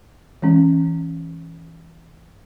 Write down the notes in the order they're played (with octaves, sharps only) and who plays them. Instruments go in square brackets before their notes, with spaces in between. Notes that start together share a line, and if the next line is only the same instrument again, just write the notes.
[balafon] E3 G#3 C#4